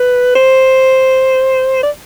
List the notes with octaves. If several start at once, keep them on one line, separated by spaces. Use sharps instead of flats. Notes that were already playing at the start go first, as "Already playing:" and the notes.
Already playing: B4
C5
D5